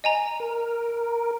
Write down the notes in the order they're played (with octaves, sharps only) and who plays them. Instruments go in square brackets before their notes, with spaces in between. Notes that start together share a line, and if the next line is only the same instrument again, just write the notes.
[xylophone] D#5 G#5 A#5
[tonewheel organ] A#4